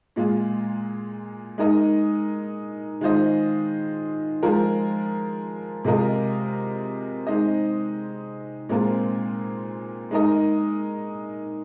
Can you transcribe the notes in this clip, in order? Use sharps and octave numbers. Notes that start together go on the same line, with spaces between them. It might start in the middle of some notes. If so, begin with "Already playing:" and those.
A#2 G#3 F4
G#3 D#4 A#4 D#5
D#3 G#3 F4 C5 D#5
F3 G#3 F4 A#4
C3 G#3 F4 A#4 D#5
G#3 C4 D#4 C5 D#5
A#2 G#3 C4 F4 A#4
G#3 D#4 A#4 D#5